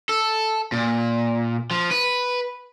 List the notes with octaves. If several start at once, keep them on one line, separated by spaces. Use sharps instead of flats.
A4
A#2
F3
B4